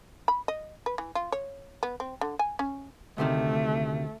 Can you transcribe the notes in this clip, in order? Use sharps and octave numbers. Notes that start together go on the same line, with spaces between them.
B5
D#5
B4
E3
F4
C#5
B3
C4
D3
G#5
C#4
D2 C3 D#3 A3